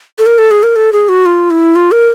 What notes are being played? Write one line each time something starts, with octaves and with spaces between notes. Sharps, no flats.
A4
A#4
A4
G#4
A#4
A4
G#4
F#4
F4
E4
F4
A#4